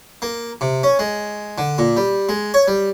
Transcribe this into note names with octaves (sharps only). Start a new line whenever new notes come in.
A#3
C3
C#4
G#3
D3
A#2
G3
G#3
C#5
G3